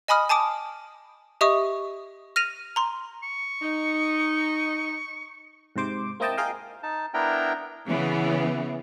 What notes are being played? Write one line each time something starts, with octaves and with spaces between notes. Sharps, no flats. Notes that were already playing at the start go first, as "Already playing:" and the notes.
D#5 G#5 B5 D#6 F6
G#5 A5 D6 D#6 D7
G4 D#5 E5 C#6 D#6
F6 A#6 D#7 F7
A#5 C6
C#6
D#4
G#2 C3 C5 D6
A#3 C4 E4 D#5 G5 A5
F4 G#4 A#4 D#5 F5 G5
D#4 A5
B3 D4 E4 A#4 G5 A#5
C#3 E3 B3